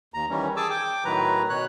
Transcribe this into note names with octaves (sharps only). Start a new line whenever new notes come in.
D#2 A#5
D#3 E3 G3 C#4
G#4 G#5 A5 D6 E6
G5 D6
A2 D#3 F#3 B4 A#5
B2 C#5 F#6